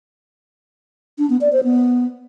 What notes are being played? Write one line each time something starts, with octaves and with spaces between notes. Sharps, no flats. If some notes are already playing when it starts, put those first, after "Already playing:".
D4
B3
D5
C5
B3